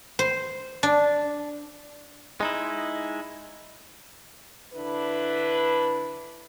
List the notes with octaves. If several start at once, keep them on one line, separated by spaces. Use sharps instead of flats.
C5
D4
G#3 D#4 E4
D3 D4 E4 B4